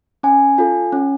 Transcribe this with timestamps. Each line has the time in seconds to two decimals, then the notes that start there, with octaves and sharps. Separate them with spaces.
0.23 C#4 G#5
0.58 F4 A4
0.92 C#4